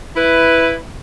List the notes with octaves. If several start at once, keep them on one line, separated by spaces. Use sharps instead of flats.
E4 B4